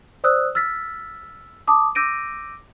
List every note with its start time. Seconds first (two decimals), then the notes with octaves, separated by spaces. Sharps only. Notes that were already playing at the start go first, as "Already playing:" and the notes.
0.24 C5 D5 D#6 E6 F#6
0.55 E6 F6 A6 B6
1.67 A5 D6 D#6
1.95 D6 E6 G6 A#6 D7 D#7